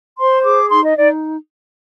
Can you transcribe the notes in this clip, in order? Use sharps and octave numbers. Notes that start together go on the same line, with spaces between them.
C5 C6
G#4 D6
D#4 C6
D#5
D#4 D5